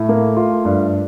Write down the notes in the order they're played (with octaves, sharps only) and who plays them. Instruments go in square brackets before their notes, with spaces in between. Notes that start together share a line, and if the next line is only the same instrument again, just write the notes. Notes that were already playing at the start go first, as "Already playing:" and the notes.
Already playing: [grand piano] A2 [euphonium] A3
[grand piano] A#3
F4
G2